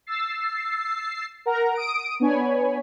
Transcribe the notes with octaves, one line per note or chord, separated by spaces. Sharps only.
E6 A6 C7
A#4 F#5 A#5
D#6 D7
B3 D4 C#5 G#5 B5